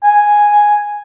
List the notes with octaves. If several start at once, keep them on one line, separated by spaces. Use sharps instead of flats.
G#5